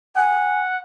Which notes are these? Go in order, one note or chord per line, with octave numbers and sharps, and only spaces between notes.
F#5 G#5